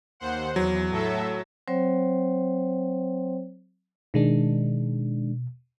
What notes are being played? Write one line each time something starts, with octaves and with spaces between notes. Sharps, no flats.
D#2 C5 F#5
E2 F#3
A2 A4 E5
F#3 C4 C5 C#5 G5
B2 D#3 G#3 D4